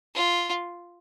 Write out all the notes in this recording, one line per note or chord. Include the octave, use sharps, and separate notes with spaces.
F4